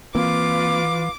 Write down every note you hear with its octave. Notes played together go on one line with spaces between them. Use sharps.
E3 A#3 C4 F4 B4 F5 D6